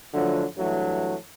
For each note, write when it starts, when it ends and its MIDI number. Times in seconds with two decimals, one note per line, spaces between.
0.14 0.45 50
0.14 0.45 53
0.14 0.45 54
0.14 0.45 57
0.57 1.15 43
0.57 1.15 52
0.57 1.15 54
0.57 1.15 57